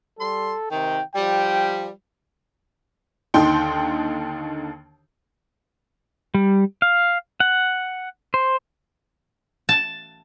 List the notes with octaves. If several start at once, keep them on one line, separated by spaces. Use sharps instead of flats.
G3 A4 C6
C3 D#3 G5
F3 G3 G5
D#2 D3 D#3 D#4 G5 C6
G3
F5
F#5
C5
A5